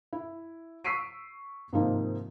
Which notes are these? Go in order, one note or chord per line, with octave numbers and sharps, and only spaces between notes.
E4
C#6 E6 B6 C7 D7 D#7
G#2 C3 D#3 F3 A#3 D#4